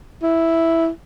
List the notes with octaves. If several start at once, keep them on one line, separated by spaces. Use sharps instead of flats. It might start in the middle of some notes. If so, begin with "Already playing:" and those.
E4